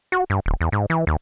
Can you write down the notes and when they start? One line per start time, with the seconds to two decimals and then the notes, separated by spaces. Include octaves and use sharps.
0.12 F#4
0.30 G2
0.46 D1
0.61 E2
0.72 G#2
0.90 E3
1.07 D#2